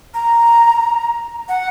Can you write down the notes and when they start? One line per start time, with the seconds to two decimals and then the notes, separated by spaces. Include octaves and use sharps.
0.14 A#5
1.48 F#5